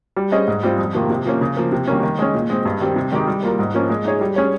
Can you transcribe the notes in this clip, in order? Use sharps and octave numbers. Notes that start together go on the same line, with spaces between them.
G3
C#4 G#4 C5 D#5
G#2
G3 C4 F4
F2
C3 D#3 A#3 F4
C3
F3 A#3 C#4
C#3
F3 A#3
C3
D#3 G3 A#3 C#4
D#3
G#3 C#4
A#2
G#3 C4
G2
D#3 G3 C4
C3
D#3 G#3 D#4 G4
G3
A#3 F4 A#4
G#2
F3 A#3 C#4
G#3
D#4 G#4 C#5
G3
C#4 G#4 C#5